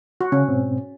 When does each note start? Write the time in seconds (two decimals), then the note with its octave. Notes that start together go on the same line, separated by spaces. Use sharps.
0.21 F#4
0.32 C#3 C#4
0.48 G#2 B2 C4